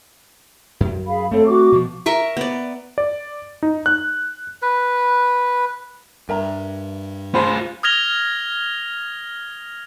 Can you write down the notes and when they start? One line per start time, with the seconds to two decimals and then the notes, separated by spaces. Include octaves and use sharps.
0.80 F#2
1.07 G#4 F5 B5
1.31 A3 C4 A4 C#5
1.46 F#4 C#6 D6
1.72 B2 F3
2.06 A#4 E5 C#6
2.37 B3 D5
2.98 D5
3.63 D#4
3.86 F#6
4.62 B4
6.29 G2 A#4 E5 A#5
7.35 F4 G#4 C5 A5 B5
7.83 D#6 F6 G#6 A#6 F7 G7